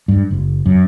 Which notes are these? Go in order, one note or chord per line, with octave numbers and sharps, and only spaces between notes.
G2
F#1
F#2